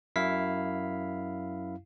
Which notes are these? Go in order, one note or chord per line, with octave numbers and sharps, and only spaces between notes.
F#2 E4 F5 B6